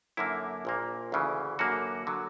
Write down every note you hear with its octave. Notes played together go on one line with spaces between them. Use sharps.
F#2 D3 A#3 E4
A#1 A#2 A#3
D2 C#3 E3
F#2 D3 A#3 F#4
D3 F#3